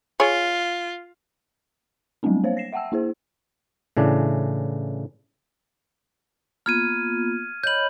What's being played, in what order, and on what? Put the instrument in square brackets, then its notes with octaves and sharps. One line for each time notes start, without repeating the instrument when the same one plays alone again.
[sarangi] F4 [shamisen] G#4 C#5
[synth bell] F#3 G3 A3 B3 C4 D4
A#3 C5 C#5 F5
A#6 C7 E7
E5 F#5 G5 A5 E6
A#3 E4 G#4 C5
[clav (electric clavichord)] A2 C#3 E3 D4
[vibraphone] A#3 B3 F4 [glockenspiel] F6 G#6 D#7
[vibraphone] C#5 D#5 B5 [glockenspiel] G6 F#7